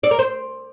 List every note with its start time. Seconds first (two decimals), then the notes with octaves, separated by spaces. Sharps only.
0.03 D5
0.11 A#4
0.19 C5